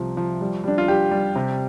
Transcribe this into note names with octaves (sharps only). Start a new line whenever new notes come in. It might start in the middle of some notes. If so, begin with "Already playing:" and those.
Already playing: C2 C3 F3
F3
G3
G3 D4
F4
G3 G4
G3
C3